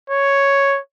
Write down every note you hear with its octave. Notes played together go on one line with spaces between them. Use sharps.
C#5